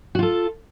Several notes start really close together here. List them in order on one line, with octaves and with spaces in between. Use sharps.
F#4 F4 A4